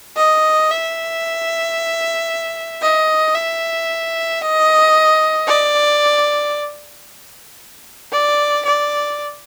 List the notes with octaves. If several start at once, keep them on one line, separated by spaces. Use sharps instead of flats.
D#5
E5
D#5
E5
D#5
D5
D5
D5